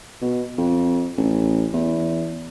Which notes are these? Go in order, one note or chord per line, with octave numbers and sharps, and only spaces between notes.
B2
F2
A1
E2